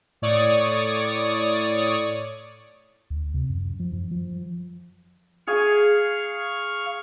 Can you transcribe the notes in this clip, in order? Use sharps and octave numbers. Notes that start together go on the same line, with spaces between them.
A2 C#5 D5 C#6 D#6
D2
C3
F#2
F3
F#2
F3
G#4 F5 G#5 C#6 F6